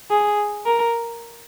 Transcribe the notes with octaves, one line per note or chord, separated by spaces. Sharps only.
G#4
A#4